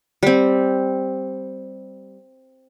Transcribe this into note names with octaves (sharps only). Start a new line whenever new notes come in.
G3 C4